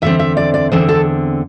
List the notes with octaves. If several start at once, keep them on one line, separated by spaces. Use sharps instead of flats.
E2 D3 C4 E5
E5
D5
D5
E2 D3 C4 C5
A4